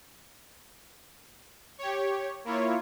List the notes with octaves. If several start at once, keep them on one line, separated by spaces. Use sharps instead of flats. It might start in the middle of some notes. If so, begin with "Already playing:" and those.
G4 C#5
A#3 E4 F4 C#5